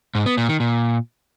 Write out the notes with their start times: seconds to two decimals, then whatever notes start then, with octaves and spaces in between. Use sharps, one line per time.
0.15 G#2
0.26 B3
0.37 A#2
0.49 D#3
0.60 A#2